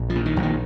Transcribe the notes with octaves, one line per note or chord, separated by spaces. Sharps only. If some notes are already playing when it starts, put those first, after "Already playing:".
Already playing: A#1
F3
A#2
D#3
A#1
D#3